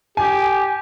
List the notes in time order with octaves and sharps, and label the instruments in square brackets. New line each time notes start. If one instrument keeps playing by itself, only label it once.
[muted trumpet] G4 [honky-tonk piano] G#5